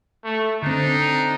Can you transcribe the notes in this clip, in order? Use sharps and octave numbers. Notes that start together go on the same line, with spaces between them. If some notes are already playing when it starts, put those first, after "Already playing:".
A3
D3 C4 D4 D#4